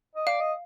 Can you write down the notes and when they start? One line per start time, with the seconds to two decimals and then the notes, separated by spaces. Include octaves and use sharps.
0.15 D#5
0.27 D5 F5
0.40 D#5